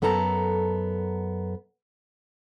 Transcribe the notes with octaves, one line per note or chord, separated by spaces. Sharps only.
F#2 B3 A4 A5 A#5